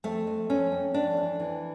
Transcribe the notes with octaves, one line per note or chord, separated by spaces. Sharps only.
F2 A3
F2
F2 C#4
F2
F2 D4
E3
E3